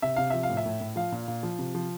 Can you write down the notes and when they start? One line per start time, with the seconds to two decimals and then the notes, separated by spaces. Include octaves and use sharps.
0.02 C3 E5
0.16 C3 F5
0.30 F3 E5
0.43 F5
0.50 A2
0.57 E5
0.66 A2
0.81 A2
0.96 F3 F5
1.12 A#2
1.28 A#2
1.43 F3
1.59 C3
1.75 F3